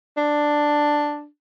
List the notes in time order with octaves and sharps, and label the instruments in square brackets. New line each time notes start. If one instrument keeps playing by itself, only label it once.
[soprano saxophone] D4